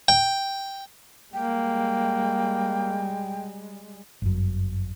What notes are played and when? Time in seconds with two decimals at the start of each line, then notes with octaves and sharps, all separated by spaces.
0.08 G5
1.33 G3 G#3 A#3 G5
4.22 G1 F#2